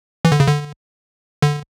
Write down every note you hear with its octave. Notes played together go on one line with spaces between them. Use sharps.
E3
D3
C#3
D3
D3